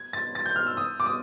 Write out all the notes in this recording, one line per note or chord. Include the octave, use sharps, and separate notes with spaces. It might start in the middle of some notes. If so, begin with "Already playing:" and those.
Already playing: G#6
A6
A6
G6
F6
E6
D#6
D6
D#6